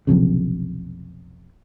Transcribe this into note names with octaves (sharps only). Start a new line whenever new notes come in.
F1 B1 F2 C#3